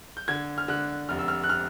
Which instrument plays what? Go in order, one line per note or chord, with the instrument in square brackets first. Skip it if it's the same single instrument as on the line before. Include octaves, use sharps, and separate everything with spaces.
[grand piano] G6
D3 G#6
F6
D3 F#6
F1 F6
E6
F6
F#6
F6